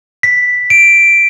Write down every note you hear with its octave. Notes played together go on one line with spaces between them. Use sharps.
B6
D7